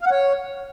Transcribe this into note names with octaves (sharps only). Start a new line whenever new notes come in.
F5
F#5
C#5